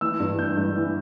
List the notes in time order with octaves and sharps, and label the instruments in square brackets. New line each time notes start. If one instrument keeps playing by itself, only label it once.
[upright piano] E3 E6
G2
E3 G6
G2
E3